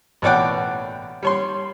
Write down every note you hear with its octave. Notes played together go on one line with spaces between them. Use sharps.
A1 B2 C#5 D5 F#5 G5
G3 C#5 C6